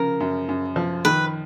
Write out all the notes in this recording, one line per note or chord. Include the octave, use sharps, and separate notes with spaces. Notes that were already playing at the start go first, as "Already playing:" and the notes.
Already playing: C#3 F3 A#4
F#2
F#2
F3
D#3 B4